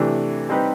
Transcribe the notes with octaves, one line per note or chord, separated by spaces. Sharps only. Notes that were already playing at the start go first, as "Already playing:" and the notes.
Already playing: C3 E3 A3 D4
G3 C4 D#4 G4 B4